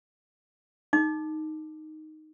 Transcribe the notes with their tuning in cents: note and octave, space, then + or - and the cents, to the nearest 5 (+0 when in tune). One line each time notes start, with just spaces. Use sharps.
D#4 +0 D6 +15